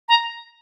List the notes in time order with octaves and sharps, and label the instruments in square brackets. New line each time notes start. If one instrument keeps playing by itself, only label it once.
[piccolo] A#5